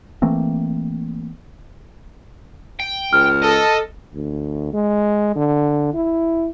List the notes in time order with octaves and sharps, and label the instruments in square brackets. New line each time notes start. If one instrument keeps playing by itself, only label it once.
[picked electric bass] E3 A3 A#3 C4
[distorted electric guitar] G5
[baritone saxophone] C#2 [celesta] F6
[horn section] A4 [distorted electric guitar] D#5
[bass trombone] D2
G#3
D3
E4